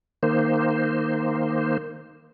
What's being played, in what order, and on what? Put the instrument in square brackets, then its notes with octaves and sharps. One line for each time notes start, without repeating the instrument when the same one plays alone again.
[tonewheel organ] D#3 A#3 C5